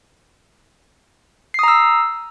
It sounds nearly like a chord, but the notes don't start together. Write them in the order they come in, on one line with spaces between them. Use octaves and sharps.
C7 D#6 A#5 E6